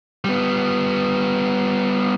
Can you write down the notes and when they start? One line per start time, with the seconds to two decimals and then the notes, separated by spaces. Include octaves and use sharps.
0.24 G3 B3